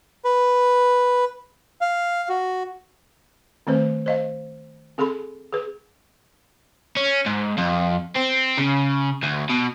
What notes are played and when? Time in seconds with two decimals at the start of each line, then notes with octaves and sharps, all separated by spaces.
0.25 B4
1.81 F5
2.29 F#4
3.67 D#3 A3 C4 B4 C5
4.06 C5 D#5 F5
4.98 C4 G#4 A4 B5 C6
5.53 G#4 B4
6.97 C#4
7.26 G#2
7.58 F2
8.16 C4
8.58 C#3
9.23 D2
9.49 B2